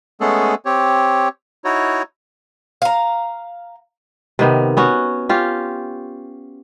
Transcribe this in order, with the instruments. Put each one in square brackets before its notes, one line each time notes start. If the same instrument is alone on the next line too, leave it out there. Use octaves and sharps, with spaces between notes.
[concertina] G#3 A3 B3 C#4 G#4 A4
C4 G4 C#5
D#4 E4 F#4 C#5
[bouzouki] F5 A#5
[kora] C3 D#3 B3
B3 C#4 F#4
C#4 F4 G4